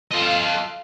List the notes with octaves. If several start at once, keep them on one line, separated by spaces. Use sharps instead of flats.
F4 A4 D#5 F5